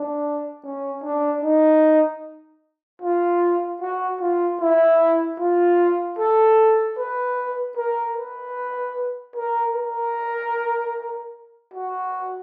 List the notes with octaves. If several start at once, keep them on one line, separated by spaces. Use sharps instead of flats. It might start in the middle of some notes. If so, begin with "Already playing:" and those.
Already playing: D4
C#4
D4
D#4
F4
F#4
F4
E4
F4
A4
B4
A#4
B4
A#4
A#4
F#4